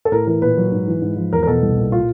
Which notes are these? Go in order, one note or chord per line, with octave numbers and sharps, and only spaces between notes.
A4
A2 A#4
E3 A#4
A#2 B4
F#3
G#2
E3
G#2
F3
E2 A#4
A#4
B2 A4
C2
A#2
F4